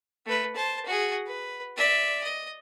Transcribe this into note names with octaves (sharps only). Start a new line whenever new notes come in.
A3 B4
C5 A5
F#4 G#4
B4
D5 E5
D#5